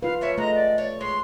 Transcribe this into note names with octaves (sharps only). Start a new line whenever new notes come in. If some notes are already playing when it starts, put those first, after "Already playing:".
F4 B4 F5
A3 C#4 C#5 E5
G#3 A3 D#5 F#5 A#5
D5
C#5
G#3 C#5 C6